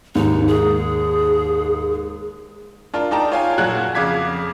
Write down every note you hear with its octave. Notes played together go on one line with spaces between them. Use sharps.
D#2 G#2 D#4
G#4
D4 F4 A#4
D#4 D5 G5 A5 A#5
F4 C#5 F5 G5 G#5
A#2 F#3 F#4 A#4 F#6 G#6
F2 C#3 F5 D6 G#6 B6